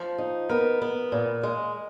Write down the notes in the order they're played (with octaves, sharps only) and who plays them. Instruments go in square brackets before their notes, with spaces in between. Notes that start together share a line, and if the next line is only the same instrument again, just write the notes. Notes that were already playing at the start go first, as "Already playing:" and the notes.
Already playing: [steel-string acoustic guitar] F3
D#4
[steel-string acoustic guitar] B3 [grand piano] A#4
[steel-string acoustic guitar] B3
A#2
G#3